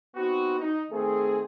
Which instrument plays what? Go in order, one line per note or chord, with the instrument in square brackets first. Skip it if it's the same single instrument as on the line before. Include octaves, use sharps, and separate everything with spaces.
[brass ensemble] B3 C4 D#4 F#4
D#4
D#3 A3 C4 G#4